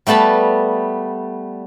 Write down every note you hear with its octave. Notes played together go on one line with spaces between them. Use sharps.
G3 A3 B3 A5 B5